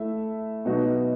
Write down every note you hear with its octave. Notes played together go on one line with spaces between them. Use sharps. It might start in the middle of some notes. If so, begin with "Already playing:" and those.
Already playing: A3 E4 E5
B2 F#3 B3 D#4 F#4